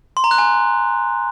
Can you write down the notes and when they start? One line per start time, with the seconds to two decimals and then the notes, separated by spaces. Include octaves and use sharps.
0.17 C6
0.24 A#5
0.31 F#6
0.38 G#5